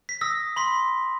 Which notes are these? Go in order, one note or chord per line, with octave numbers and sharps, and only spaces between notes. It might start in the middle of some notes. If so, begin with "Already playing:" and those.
B6
D#6 E6 A#6
B5 C6 B6